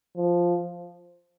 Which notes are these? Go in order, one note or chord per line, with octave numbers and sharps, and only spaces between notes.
F3